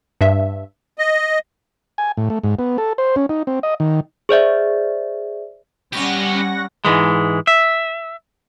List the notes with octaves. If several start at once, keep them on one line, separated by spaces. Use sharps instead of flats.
G2 E5
D#5
G#5
A2
A3
G#2
B3
A4
C5
C#4
D#4
C4
D#5
D#3
G#4 C5 D5 E5
G3 B3 C#4 G4 F#5 C#6 A#6
G#2 E3 G#3
E5